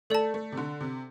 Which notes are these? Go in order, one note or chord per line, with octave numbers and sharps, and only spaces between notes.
A3 A4 D5 A5
A3
C3
D3
C3